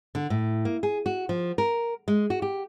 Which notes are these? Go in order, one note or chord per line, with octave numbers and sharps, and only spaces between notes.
D3
A2
A#3
G#4
F#4
F3
A#4
G#3
F#4
G4